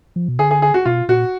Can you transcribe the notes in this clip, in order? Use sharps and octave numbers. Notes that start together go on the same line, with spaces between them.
F3
B2
D3 G#4
G#4
G#4
F#4
B2 F4
A#2 F#4